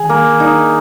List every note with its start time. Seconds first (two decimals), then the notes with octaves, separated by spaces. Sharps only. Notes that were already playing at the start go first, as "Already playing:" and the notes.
Already playing: D#3 G#4
0.09 A#3
0.40 D#4